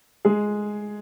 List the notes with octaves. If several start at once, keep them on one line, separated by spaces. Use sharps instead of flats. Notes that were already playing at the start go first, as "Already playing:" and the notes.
G#3 G#4